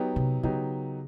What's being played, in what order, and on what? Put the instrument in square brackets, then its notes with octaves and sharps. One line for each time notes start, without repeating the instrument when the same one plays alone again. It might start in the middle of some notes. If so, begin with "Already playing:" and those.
Already playing: [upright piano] F#3 B3 D#4 G4
[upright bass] C3
[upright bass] C#3 [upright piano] F#3 B3 D#4 G4